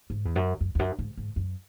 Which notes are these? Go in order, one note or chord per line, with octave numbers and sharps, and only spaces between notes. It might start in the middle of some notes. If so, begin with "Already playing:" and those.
G#2
E2
F#2
F#2
E2
F#2
G#2
G#2
F#2